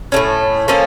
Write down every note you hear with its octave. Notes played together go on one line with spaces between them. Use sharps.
A2 F#3 A3 C#4
F3 A#3 C#4 A4